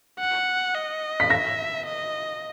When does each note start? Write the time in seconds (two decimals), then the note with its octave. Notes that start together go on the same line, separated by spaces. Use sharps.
0.20 F#5
0.75 D#5
1.20 B6
1.30 E5 A#6
1.86 D#5